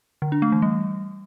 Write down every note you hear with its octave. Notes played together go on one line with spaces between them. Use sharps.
D3
D4
A3
E3
G3